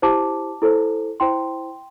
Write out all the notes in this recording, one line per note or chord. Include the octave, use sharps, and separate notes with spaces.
E4 G4 C5 A5 D6
E4 A4 C5
E4 C5 G5 C6